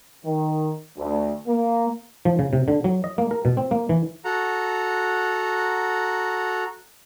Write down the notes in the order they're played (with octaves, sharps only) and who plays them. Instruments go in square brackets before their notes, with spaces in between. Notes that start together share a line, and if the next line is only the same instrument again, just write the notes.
[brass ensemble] D#3
D2
A#3
[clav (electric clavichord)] F3
C#3
C3
D3
F#3
D#5
A#3
A#4
B2
C4
A#3
E3
[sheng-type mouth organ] F#4 A4 F#5 A#5